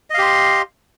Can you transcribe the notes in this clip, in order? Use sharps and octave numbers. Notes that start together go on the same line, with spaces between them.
G4 D#5 F5 C6